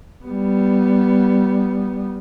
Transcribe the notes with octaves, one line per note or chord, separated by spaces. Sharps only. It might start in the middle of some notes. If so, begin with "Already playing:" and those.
G3 B3